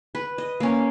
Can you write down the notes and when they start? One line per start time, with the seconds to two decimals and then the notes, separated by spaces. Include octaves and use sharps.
0.15 B4
0.38 D#5
0.60 A#3 C#4